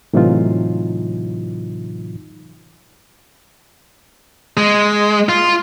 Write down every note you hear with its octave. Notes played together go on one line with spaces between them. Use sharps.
A2 C3 E3 F#3 D#4 F4
G#3
F4